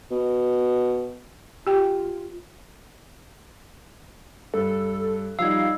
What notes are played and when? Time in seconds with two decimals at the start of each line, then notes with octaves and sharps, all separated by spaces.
0.11 B2
1.67 F4 G4 G5
4.54 G2 A4
5.39 F3 G3 D#4 F5 E6 G#6